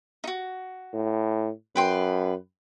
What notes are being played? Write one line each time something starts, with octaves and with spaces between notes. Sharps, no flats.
D#4 F#4
A2
F#2 B4 G5 C6